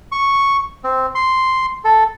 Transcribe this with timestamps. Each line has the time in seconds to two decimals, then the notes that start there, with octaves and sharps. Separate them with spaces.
0.12 C#6
0.84 C4
1.15 C6
1.84 A4